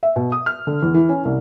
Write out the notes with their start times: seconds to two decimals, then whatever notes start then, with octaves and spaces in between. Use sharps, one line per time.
0.03 E5
0.16 B2
0.32 D#6
0.46 F6
0.67 D3
0.82 E2
0.94 E3
1.09 C#4
1.25 C2